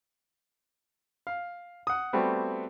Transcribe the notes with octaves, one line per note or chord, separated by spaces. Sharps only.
F5
F#5 D#6
G3 A3 B3 C4 F#4